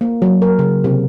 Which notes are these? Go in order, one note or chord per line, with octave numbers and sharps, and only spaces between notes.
A#3
F#3
A#4
C#3
C3